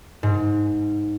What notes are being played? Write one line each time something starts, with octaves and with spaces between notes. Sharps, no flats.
G#2